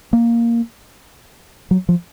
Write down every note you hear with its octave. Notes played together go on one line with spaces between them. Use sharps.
A#3
F#3
F3